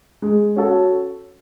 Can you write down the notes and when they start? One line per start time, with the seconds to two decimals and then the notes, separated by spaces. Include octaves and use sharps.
0.22 G#3
0.56 C#4 F#4 A4